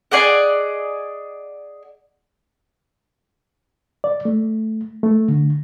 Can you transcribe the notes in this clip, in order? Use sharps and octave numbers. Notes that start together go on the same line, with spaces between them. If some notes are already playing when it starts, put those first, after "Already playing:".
G#4 D5 D#5 F#5
D5
A3
A3
D3